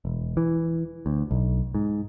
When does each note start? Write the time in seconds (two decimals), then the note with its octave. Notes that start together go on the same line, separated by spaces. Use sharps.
0.05 E1
0.37 E3
1.06 D2
1.31 B1
1.75 G#2